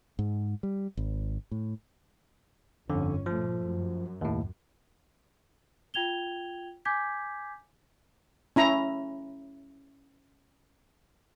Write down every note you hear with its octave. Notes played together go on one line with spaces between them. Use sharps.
G#2
G3
G#1
A2
G1 F2 D3 C#4
A#2 F3 A3
F#2
D#2 A2
F4 G5 G#6 F7 G7
G#5 D6 G6 G#6 B6
C#4 E4 A#5